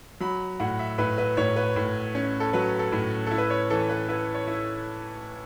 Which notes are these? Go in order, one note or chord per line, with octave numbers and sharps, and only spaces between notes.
F#3 B5
A2 F#5
E5
A2 B4
B4
A2 C#5
B4
A2
C#4
A4
F#3 B4
A4
A2
E4 A4
B4
C#5
E3 A4
B4
E4 B4
C#5
E4